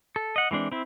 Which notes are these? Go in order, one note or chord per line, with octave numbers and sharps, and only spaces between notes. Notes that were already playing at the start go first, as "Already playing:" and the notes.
A4
D#5 F#5
E3 G#3 C4 D4
C4 E4